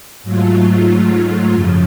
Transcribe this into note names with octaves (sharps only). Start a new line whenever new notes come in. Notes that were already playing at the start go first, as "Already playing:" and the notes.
G#2 F#3 A3 F4
F#2 C#3 F3